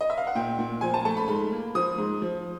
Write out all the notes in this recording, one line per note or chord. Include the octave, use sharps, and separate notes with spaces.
D#5
E5
F5
F#5
A#2 G5
A#2
F3 G#5
A5
A3 A5
B5
G#2 B5
A#3
F3 D#6
G#2
F3